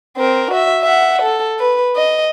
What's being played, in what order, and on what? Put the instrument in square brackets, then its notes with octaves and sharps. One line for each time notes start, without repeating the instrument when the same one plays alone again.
[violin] C4 A#4
F#4 E5
E5 F#5
A4
B4
D#5